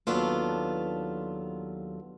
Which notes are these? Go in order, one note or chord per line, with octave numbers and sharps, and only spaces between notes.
D#2 F#3 B3 D4 F4 A4